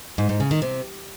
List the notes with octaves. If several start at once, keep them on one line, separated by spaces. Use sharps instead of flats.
G#2
G#2
C#3
D#3
C3